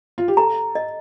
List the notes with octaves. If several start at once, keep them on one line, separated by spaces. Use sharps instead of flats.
F4
G4
A4 A#5
D#5